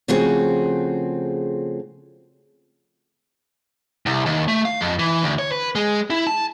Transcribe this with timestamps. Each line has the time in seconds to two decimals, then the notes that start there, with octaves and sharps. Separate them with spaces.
0.08 C#3 F3 A3 C4 F#4 G#4
4.06 C2
4.26 D#2
4.48 A3
4.65 F5
4.81 F2
4.99 E3
5.23 D2
5.39 C#5
5.52 B4
5.75 G#3
6.10 E4
6.27 A5